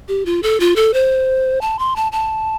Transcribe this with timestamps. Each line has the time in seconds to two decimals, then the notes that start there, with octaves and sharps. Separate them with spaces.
0.08 G4
0.26 F4
0.43 A4
0.60 F4
0.76 A4
0.94 C5
1.61 A5
1.79 C6
1.96 A5
2.12 A5